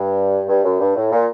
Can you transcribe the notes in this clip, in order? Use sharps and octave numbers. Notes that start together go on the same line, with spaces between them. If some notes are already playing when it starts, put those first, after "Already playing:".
Already playing: G2
G2
F#2
G2
A2
A#2